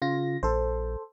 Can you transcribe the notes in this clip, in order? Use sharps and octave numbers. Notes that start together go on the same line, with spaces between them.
C#3 F4 A#6
A#1 A4 C5